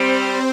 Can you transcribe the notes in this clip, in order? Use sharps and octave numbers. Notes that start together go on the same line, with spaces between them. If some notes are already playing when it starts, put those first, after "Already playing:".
Already playing: G3 C4 C5